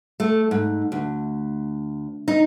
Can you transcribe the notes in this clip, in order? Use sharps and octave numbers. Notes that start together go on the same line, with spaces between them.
A3
G#2
D2
D#4